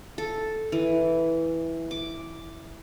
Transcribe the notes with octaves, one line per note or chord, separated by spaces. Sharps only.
A4
E3
D6